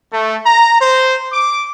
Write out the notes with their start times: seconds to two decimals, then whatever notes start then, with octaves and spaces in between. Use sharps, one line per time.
0.13 A3
0.46 A#5
0.81 C5
1.33 D6